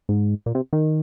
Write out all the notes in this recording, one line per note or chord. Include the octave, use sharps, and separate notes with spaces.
G#2
A#2
C3
D#3